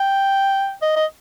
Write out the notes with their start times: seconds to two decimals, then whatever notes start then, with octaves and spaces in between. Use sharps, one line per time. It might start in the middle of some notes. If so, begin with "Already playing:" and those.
Already playing: G5
0.82 D#5
0.96 D#5